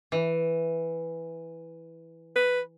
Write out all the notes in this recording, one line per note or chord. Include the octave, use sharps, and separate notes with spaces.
E3
B4